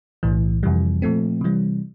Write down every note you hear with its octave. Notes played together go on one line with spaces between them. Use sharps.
B1 A2 E3
F2 C3 E3 G3
A#2 F3 A3 C4
C3 E3 G3